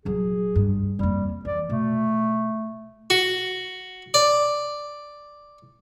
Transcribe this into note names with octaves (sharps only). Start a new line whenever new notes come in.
D#1 F#3 G#4
G2
F2 G3 A#3
E3 D5
B2 A3
F#4
D5